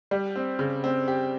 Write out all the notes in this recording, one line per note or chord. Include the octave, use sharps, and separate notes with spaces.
G3
C4
C#3
C4
G4